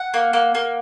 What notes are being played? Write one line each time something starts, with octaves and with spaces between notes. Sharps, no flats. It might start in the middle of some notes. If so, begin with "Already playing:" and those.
Already playing: F#5
A#3
A#3
A#3